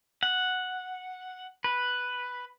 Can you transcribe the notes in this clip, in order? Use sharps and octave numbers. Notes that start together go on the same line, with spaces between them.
F#5
B4